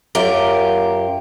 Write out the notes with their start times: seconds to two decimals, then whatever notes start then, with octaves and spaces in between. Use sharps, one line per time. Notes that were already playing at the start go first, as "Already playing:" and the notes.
0.15 F#2 F4 G4 A#4